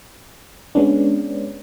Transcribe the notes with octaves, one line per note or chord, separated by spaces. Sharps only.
G#3 B3 C#4 D4